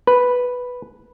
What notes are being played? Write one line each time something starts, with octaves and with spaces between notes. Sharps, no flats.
B4